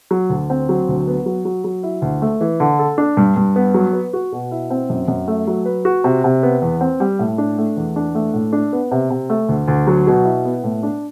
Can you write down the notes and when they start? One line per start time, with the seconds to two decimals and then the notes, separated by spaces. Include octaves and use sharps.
0.11 F#3
0.30 D2
0.50 C4
0.69 F#3
0.88 D2
1.07 B3
1.26 F#3
1.45 F#3
1.64 F#3
1.83 E4
2.02 D2
2.22 A3
2.41 E3
2.60 D3
2.79 A4
2.98 D4
3.17 G2
3.36 G2
3.56 B3
3.74 F#3
3.93 B4
4.13 F#4
4.32 B2
4.51 E4
4.70 C4
4.90 F#2
5.08 F#2
5.28 A3
5.47 F#3
5.66 B4
5.85 F#4
6.04 C3
6.24 C3
6.43 B3
6.62 E2
6.81 C4
7.00 G3
7.19 A2
7.38 D4
7.58 A3
7.77 E2
7.96 D4
8.15 A3
8.34 A2
8.53 D4
8.73 B3
8.91 C3
9.10 C3
9.30 A3
9.49 D2
9.68 D2
9.87 F#3
10.07 B2
10.25 E4
10.45 B3
10.64 A2
10.83 D4